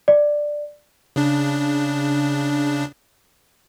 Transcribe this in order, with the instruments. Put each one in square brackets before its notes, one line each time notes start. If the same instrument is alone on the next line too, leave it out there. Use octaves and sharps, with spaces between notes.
[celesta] D5
[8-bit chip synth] C#3 D4